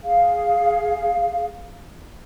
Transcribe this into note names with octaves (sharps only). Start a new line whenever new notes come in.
G#4 F5